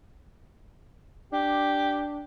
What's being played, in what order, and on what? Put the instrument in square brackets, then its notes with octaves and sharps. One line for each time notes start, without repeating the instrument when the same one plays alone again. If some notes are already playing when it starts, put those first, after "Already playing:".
[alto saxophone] D4 [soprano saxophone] G4